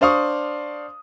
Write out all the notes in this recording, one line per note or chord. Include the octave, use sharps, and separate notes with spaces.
D4 C5 D5 F5 C#6 D#6